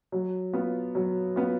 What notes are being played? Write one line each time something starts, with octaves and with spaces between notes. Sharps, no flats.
F#3
B3 F4
F#3
B3 F4